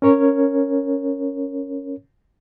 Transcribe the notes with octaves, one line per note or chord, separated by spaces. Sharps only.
C#4 A#4 C#5